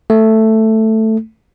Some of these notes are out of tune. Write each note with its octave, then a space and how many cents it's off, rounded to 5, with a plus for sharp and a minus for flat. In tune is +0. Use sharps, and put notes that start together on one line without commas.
A3 +5